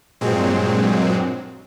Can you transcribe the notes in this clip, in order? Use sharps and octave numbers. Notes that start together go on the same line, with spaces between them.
G2 A#2 F#3 G#3 C4